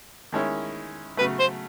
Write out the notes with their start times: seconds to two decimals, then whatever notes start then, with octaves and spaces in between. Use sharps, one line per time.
0.32 D#3 G#3 C#4 E4
1.17 C#3 F#3 A3 B4
1.39 C5